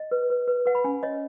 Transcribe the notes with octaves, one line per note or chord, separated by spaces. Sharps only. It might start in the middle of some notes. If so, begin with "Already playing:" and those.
Already playing: D#5
B4
B4
B4
B4 F#5
B5
C#4 G#5
C#5 D#5